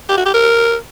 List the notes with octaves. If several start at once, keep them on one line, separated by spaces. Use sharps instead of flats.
G4
F#4
G4
A#4